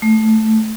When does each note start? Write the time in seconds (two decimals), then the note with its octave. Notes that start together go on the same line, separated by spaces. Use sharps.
0.02 A3